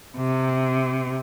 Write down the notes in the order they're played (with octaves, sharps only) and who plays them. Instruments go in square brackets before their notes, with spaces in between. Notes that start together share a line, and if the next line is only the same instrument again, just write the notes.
[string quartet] C3